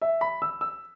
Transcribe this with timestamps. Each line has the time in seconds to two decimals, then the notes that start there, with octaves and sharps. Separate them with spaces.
0.01 E5
0.21 B5
0.42 E6
0.61 E6